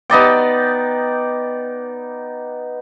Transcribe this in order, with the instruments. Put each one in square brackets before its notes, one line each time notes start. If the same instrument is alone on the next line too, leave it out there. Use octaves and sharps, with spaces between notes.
[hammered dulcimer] B3 D#4 D5 G5